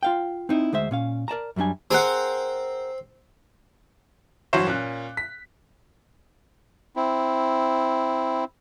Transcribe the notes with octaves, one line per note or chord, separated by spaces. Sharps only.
F4 F5 G5
C4 D#4 E4
D2 G#3 C5 E5
A#2 C#4 F5
A#4 D5 A5 A#5
F#2 F#3 G3 D4 G#5
C4 G#4 A#4 C5 F#5
G2 E3 F#3 F#4 C5 C#6
A#2 C#4 F#6
B6
C4 E4